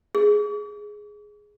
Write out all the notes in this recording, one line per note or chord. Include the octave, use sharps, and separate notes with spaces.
G#4